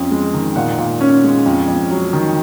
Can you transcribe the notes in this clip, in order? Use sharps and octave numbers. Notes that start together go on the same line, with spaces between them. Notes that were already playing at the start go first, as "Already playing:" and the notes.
Already playing: F2 C#4
G#3
D#3
A#2 F#5
A#2
C#4
G#3
F2
F2
F#3
D#3